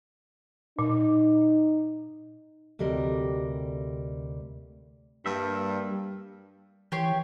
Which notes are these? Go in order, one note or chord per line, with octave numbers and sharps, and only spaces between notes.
A#2 D#4
D2 C3 G3 A#4 D#5
G2 G3 A#3 E5
E3 G4 C#5 C6